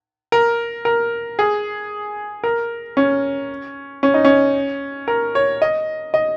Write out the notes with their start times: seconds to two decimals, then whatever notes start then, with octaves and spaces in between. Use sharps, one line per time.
0.32 A#4
0.85 A#4
1.39 G#4
2.44 A#4
2.97 C#4
4.03 C#4
4.14 D#4
4.25 C#4
5.08 A#4
5.35 C#5
5.62 D#5
6.14 D#5